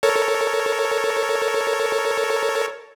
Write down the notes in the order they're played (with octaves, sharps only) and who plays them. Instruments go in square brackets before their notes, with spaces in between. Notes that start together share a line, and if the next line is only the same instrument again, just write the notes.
[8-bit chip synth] A4 A#4 C#5